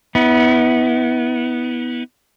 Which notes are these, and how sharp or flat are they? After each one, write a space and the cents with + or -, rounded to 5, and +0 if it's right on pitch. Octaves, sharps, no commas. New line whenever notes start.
B3 +0 E4 -30